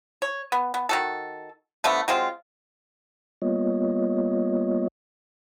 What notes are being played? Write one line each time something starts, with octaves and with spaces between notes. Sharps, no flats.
C#5
B3
B3
D#3 F#4 A4
D3 F3 A3 B3
F#3 G#3 C4 F4
G3 A#3 B3 F4 C#5 D#5